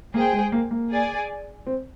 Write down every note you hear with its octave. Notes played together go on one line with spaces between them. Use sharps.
A#3 G#4 C5 G5
G#3
A#3
A#3
G#4 D5 G#5
C4